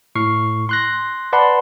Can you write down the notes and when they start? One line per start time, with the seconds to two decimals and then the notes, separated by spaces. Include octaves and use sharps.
0.15 A2 C#6 F6 C7
0.69 C6 F#6 A#6
1.33 B4 D5 F#5 A5 B5 C6